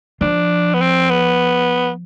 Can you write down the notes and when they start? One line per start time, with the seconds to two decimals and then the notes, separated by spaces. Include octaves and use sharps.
0.21 F3 D4
0.74 B3
0.81 C4
1.10 B3